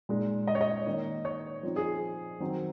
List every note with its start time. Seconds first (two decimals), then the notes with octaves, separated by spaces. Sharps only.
0.09 A#2 G#3 D#4
0.47 D#5
0.55 C#5
0.61 D#5
0.86 D#3 A#3 D#4
1.25 C#5
1.63 F3 C4 D#4
1.76 G#4
2.40 D#3 F#3 C4 D#4